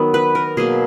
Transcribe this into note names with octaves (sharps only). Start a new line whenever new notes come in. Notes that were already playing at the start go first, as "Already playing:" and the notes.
Already playing: D#3 F#3 B3
B4
A#4
B2 F#3 A#3 G#4